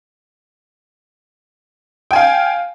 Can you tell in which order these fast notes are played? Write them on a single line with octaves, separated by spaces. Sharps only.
G5 G#5 F5